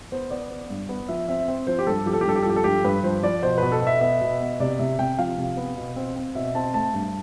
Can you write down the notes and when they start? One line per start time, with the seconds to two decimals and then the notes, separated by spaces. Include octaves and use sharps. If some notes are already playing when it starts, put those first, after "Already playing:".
0.12 B3 C5
0.30 B3 D5
0.50 B3
0.70 G2
0.89 B3
1.09 F3 E5
1.28 C4 E5
1.48 C4
1.67 F3 C5
1.79 G4
1.87 G2 A4
2.06 F3 G4
2.13 A4
2.21 G4
2.26 G2 A4
2.36 G4
2.42 A4
2.46 F3 G4
2.56 A4
2.64 G2 G4
2.84 G2 B4
3.04 F3 C5
3.23 F3 D5
3.42 B2 C5
3.58 B2 B4
3.72 A4
3.82 B2
3.87 E5
4.01 B3 E5
4.21 B2
4.40 B3
4.60 C3 D5
4.79 C3 E5
4.99 C3 G5
5.19 F3 F5
5.38 C3
5.57 B3
5.77 B2
5.96 C4
6.16 C4
6.35 B2 E5
6.55 C4 A5
6.74 A3 A5
6.94 G2